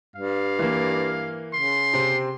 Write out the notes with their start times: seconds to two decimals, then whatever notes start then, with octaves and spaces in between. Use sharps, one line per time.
0.16 G2 F5
0.59 E3 A#3
1.54 C#3 C6
1.94 C3 C4